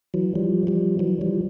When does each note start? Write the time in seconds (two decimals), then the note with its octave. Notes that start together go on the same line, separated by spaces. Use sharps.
0.14 E3 F#3
0.35 F3 G3
0.67 F3 G3
0.99 E3 F#3
1.21 F3 G3